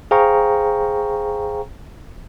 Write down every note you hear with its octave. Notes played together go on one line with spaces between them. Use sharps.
G#4 C5 F5 G5 A#5 C#6